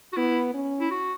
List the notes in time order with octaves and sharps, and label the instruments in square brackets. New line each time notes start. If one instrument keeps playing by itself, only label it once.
[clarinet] F#4
[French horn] B3 [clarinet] E4
[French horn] C#4
[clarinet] E4
F#4